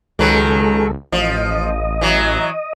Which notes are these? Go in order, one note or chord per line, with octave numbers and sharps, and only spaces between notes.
C#2 D#3 F#3 G#3 A4 B4
A1 F3 D#5
E3 F#3